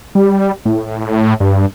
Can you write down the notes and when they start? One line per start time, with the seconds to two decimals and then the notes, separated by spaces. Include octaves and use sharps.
0.15 G3
0.65 A2
1.40 G2